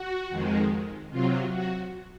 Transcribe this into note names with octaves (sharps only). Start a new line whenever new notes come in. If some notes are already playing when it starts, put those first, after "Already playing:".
Already playing: F#4
F2 D#3 G#3
C3 F#3 F4
F#4